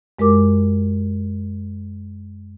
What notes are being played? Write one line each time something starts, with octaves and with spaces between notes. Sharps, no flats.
F#2 G#3 G4 A#4 D6